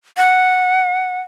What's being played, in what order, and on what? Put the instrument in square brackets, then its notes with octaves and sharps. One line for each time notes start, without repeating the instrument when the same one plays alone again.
[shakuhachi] F#5